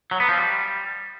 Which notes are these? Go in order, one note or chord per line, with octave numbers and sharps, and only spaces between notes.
F#3
B3
F3
G3